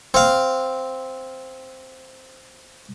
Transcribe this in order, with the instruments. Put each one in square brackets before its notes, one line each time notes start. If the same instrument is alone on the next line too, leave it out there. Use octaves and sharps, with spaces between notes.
[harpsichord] C4 F5